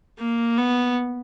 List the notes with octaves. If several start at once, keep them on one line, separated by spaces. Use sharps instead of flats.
A#3
B3